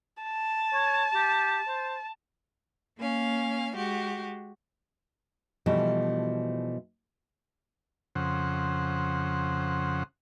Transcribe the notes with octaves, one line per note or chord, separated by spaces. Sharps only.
A5
C#5
G4
C5
A#3 C#4 F5
G#3 F#4 G4
B2 E3 F3 G3 A3
F2 C#3 C5 F#5